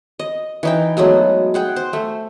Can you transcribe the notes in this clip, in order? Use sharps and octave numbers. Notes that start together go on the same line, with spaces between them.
D#5
E3 D#4 G5
F#3 G#3 A3 B3
G#4 F#5 G5
C5
A3